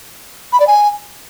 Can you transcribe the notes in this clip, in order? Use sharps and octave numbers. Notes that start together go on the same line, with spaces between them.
B5
D5
G#5